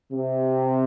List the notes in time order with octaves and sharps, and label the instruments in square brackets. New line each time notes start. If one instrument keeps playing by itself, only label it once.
[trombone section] C3